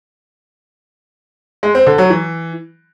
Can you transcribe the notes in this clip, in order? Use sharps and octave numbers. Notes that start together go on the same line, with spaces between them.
G#3
C4
D3
F#3
E3